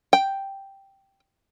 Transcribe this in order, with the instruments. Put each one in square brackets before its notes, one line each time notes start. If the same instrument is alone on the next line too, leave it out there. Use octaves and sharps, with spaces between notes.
[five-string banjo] G5